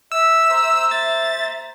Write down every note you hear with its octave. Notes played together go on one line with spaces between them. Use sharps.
E5 E6
C5 A#5
E5 A6